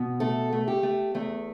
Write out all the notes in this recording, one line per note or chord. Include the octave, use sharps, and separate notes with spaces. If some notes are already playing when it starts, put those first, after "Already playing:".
Already playing: B2
A3 A4
A3
G4
A3
E2 A3